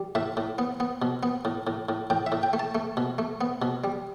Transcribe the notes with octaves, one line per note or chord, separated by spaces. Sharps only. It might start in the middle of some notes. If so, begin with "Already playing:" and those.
Already playing: G3
A2 E5
A2
B3
B3
B2
B3
A2
A2
A2
A2 G5
E5
A2
G5
A3
A5
A3
B2
A3
B3
B2
G3